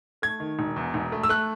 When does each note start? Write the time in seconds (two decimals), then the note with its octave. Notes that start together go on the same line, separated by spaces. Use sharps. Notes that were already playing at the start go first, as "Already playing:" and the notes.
0.22 A3 G#6
0.40 D#3
0.59 E1
0.76 E2
0.94 E1
1.12 A3
1.23 E6
1.29 A3 F#6